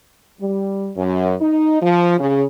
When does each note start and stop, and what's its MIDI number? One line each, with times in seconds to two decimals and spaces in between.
0.40 0.90 55
0.96 1.34 42
1.41 1.80 63
1.81 2.17 53
2.18 2.44 49